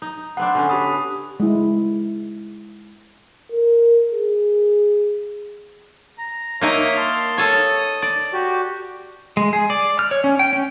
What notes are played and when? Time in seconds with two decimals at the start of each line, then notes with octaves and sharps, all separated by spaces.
0.02 D#4
0.37 B3 C4 D4 F#5
0.55 D3 C#4 D4
0.69 G4 B5 D#6
1.40 G#3 E4
3.52 A#4
4.12 G#4
6.18 A#5
6.61 A#3 D#4 C#5 E5 A#5
6.96 A5 C6 F6
7.38 A4 C#5 D#6
8.02 D5
8.33 F#4 G4
9.37 G#3
9.53 G#4
9.70 D5
9.99 F6
10.11 C#5
10.24 C#4
10.39 G5
10.53 C#4